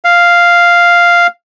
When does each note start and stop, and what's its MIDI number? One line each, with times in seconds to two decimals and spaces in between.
0.05 1.27 77